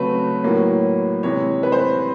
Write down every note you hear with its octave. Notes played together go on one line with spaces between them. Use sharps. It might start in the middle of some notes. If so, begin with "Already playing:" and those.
Already playing: C#3 F#3 A3 C4 B4
A2 F#3 A#3 C#4
C3 E3 G#3 C#5
B4
C5
B4